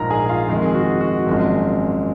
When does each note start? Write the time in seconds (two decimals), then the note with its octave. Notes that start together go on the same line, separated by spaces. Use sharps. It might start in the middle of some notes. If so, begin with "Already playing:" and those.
Already playing: A#1 G#2 F3 A#4 A#5
0.11 G#4 G#5
0.29 F4 F5
0.49 F2 D#3 G#3
0.65 G#4
0.74 F#4
1.01 F#4
1.27 G#1 F#2 F3 G#3